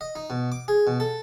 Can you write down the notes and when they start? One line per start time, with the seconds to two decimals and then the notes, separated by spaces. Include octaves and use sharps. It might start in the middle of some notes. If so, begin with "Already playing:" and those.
0.01 D#5
0.16 D#4
0.30 B2
0.52 D6
0.68 G#4
0.87 B2
1.00 A4